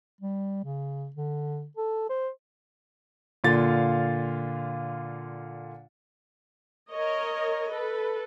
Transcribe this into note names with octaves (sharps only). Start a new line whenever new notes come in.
G3
C#3
D3
A4
C5
A#2 D3 F4 F5 A6
A#4 C#5 D#5
A4 B4